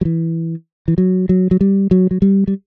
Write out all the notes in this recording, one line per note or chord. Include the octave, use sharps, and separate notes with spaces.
F#3
E3
E3
F#3
F#3
F#3
G3
F#3
F#3
G3
G3